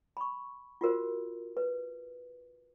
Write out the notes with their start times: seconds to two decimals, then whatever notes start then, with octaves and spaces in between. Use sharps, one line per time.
0.17 B5 C#6
0.81 F4 F#4 A#4 C5
1.57 B4